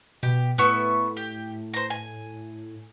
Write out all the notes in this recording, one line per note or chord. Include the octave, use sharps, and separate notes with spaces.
B2 G4
A2 B3 E5 C#6
G4
C5 A#5
G#5